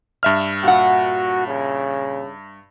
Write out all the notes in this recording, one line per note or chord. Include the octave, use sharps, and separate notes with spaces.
G2 E5 F6
A#2 F#4 F#5
C#3